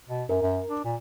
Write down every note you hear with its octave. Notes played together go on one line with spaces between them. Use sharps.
B2
F#2 A#4
F#2
D4
A#2